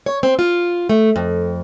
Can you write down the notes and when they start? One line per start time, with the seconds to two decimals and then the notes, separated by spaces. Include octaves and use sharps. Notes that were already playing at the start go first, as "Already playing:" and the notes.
0.06 C#5
0.23 C4
0.39 F4
0.89 A3
1.16 F2